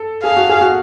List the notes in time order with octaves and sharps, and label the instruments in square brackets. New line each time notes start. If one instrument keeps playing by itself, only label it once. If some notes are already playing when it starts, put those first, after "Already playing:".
Already playing: [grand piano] A4
[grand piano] G#4 [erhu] F5
[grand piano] F#4
G#4
F#4